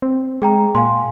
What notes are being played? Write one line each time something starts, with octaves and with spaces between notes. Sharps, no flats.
C4
G#3 G#4 G5 A#5
A#2 F5 G#5 C6